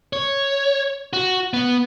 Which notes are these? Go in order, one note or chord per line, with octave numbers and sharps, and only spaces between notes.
C#5
F#4
B3